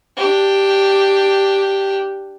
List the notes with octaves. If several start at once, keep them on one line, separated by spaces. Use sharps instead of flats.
D4 G4